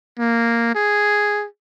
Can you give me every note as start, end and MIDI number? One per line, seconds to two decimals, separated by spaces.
0.19 0.70 58
0.75 1.46 68